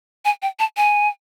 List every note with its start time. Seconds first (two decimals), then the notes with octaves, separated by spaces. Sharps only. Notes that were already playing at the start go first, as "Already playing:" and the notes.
0.25 G#5
0.42 G5
0.59 A5
0.77 G#5